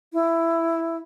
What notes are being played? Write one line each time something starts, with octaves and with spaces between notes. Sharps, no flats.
E4